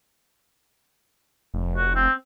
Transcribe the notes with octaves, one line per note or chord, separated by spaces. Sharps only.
F1
F#4
C4